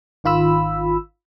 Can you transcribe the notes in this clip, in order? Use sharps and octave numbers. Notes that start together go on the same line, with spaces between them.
G#1 D#3 F4 B5 E6